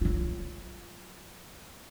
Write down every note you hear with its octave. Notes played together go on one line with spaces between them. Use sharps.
F#3 F4